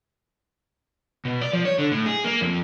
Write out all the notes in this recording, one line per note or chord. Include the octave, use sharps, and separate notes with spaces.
B2
D5
F3
C#5
D3
A2
G#4
A#3
F2